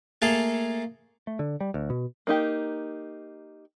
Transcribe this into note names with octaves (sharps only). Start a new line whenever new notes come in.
A3 A#3 G#4 A4 F5 A5
A3
D3
G3
D2
B2
A#3 D#4 G4